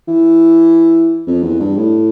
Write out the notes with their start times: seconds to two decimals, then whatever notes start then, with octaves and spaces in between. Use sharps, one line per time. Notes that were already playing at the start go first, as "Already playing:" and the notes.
0.08 E3
1.27 F2
1.43 E2
1.60 G2
1.77 A2